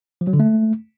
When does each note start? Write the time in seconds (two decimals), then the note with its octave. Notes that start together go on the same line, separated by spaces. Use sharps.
0.21 F3
0.27 F#3
0.33 D3
0.40 A3